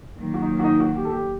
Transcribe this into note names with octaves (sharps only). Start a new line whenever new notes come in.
D#3 F#3 A#3
F#4
D#4
F#4
D#4
F#4
G4
A4
G4